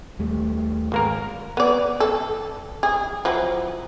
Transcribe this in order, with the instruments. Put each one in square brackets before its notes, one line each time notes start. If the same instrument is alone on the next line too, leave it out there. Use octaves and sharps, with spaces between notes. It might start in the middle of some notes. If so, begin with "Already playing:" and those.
[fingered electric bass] D#2 G3 A3
[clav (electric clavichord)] G#1 A#3 A#4
[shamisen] B3 D5
A4
G#4
F3 F#3 E4